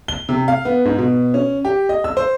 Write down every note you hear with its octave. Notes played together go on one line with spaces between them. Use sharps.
G7
C3
F5
B3
G#2
B2
C#4
G4
D#5
E6
C5